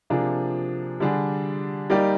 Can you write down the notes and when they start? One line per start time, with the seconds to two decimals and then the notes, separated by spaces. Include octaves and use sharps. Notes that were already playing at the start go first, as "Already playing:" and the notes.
0.10 C3 F3 A#3 D4 G#4
1.00 D3 G3 D4 G#4
1.90 G3 A#3 D#4 G4 D5